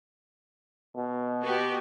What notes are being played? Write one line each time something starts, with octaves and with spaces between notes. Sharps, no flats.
B2
B3 F#4 G4